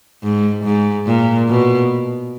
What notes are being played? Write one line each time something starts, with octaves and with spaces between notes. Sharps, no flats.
G#2
G#2
A#2
B2